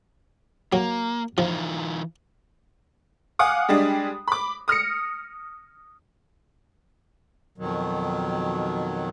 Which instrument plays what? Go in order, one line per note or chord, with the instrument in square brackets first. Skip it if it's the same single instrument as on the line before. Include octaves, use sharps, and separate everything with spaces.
[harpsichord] F#3 [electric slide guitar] A#3
[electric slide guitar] E3 D#4 F4 [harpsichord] F3
[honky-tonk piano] F5 F#5 G#5 D6 D#6
G3 G#3 D4
B5 D6
D#6 F6 A#6 C#7
[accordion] F2 B2 D#3 F#3